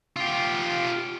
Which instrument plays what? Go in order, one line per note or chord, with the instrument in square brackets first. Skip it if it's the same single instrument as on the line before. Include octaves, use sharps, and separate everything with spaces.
[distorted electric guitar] F4 G4